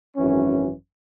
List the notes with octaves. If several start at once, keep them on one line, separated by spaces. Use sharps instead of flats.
G#1 F#2 E3 C#4